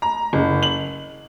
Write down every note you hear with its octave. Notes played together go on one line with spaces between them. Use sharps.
A#5
F#1
F#7